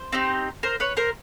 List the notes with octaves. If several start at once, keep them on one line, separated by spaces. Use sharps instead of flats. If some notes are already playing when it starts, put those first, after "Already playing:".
Already playing: C5
C4 D#4 G4
A#4 C5
B4 C#5
A#4 C5